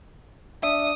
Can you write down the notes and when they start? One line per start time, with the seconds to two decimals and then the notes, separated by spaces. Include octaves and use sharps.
0.63 D4 E5 D#6